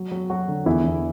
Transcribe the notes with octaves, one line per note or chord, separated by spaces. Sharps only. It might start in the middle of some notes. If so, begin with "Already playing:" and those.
Already playing: F#3 F#4
F#3
F#3 F#4
D3
E2 E4
E2